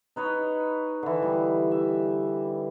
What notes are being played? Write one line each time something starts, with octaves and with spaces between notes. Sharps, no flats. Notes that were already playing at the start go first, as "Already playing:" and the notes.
D#4 B4 C#5 D#5
D3 E3
G3
E5